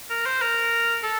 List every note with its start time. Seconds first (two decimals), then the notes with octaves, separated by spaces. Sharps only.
0.10 A#4
0.26 C5
0.42 A#4
1.03 A4